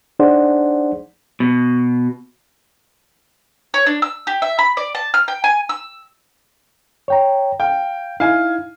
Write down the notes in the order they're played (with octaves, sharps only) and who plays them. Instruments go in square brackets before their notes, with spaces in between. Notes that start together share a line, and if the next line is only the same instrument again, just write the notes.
[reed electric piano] D4 D#4 G#4 C5 D5 F#5
[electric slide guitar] B2
[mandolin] C#5
D4
E6
G4
E5
B5
D5
A5
F6
G5
G#5
E6
[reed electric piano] C#5 G5 A#5
[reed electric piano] F5 [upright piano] G5
[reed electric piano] D#4 E4 [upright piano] F5 G#5